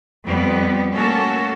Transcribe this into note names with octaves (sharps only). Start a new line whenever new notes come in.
F2 G3 B3 B4
A3 A#3 C#4 F#4 A4